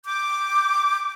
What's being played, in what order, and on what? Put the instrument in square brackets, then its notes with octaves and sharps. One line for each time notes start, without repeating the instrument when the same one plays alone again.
[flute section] D6 G6